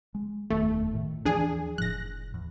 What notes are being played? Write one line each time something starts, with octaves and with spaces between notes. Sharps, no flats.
G#3
F#1 E2 D#3 A3
A2 D#3
D#2 E3 F3 D4 G#4 G#5
F1 A2 F3 F#6 A#6
E2